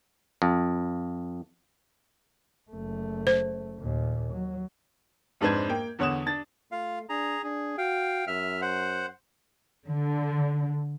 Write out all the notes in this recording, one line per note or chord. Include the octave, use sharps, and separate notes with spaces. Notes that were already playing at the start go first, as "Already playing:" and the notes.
F2
F#1 A3
C5
D#2 A#2
F#3
F2 G#2 D4 B4 C5 G#6
A#3 G5
E2 D3 C#5 F#5 D#6 E7
D4 A6
A3 F4 F5
D4 G#4 A#5
D4 G#4
F#4 F5 G5
F#2 E5 F6
C5 F#5
D3